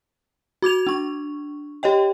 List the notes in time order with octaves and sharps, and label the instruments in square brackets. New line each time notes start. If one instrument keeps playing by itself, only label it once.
[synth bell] F#4 D6 G#6 F7
D4 C#6
G4 C#5 D#5 G5